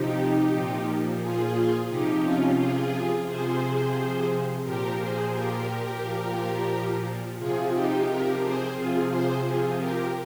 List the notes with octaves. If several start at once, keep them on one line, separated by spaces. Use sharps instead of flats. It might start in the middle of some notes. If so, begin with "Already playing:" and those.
Already playing: C3 F3 D#4 G4
A#2 F3
F4 G#4
C3 F3 D#4 G4
C#4 F4
F4 G#4
C3 F3 G#4 C5
A#2 F3 G4 A#4
G#4 C5
G4 A#4
A#2 F3
C3 F3 F4 G#4
D#4 G4
G4 A#4
G#4 C5
C3 F3 F4 G#4
G#4 C5
F4 G#4
G4 A#4